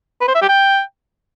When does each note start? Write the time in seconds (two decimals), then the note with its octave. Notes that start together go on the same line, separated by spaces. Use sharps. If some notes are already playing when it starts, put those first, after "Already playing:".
0.21 B4
0.28 C5
0.35 E5
0.42 G4
0.49 G5